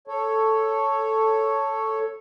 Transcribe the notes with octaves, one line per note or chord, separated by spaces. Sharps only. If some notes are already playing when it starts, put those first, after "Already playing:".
A4 C#5